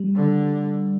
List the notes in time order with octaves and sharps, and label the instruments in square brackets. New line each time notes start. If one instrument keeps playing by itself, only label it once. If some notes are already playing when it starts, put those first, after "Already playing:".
Already playing: [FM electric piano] G3
[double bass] D3